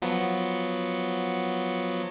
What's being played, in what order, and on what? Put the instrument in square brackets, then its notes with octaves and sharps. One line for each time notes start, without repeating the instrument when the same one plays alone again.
[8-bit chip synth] F3 F#3 B3